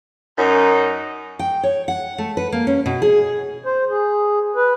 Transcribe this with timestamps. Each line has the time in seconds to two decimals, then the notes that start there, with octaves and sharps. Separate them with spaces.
0.38 F#2 D#4
1.39 G5
1.63 C#5
1.88 F#5
2.18 A3
2.37 B4
2.52 A#3
2.67 C#4
2.86 B2
3.02 G#4
3.66 C5
3.90 G#4
4.56 B4